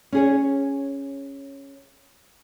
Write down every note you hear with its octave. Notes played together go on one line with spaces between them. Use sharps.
C#4 G#4 C#5